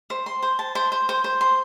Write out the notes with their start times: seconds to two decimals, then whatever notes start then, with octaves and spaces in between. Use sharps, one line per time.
0.10 C5
0.26 C6
0.43 C5
0.59 A5
0.75 C5
0.92 C5
1.09 C5
1.24 C5
1.41 C6